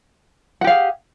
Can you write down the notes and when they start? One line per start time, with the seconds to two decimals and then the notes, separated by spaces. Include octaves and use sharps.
0.61 F#5
0.64 G4
0.67 F5
0.70 G#4